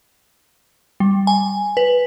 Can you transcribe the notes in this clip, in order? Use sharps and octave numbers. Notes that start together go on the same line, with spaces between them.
G3
G#5
B4